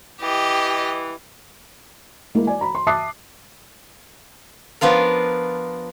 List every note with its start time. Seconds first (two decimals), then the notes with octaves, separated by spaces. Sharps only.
0.21 E3 G4 D#5
2.35 G#3 A#3 E4
2.47 D5 G#5
2.61 A#5 B5
2.75 C6
2.87 E5 A5 D6 D#6 F#6 C7
4.81 F3 B3 D4 F4 A#4